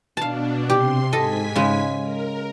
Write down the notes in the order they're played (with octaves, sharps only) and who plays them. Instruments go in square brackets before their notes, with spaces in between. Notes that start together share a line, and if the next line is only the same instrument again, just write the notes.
[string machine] B2 D4 [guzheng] F5 A5
[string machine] C3 C6 [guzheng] G4
[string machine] G#2 G#5 B6 [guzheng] A4 D#5
[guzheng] C#3 G#3
[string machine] A#4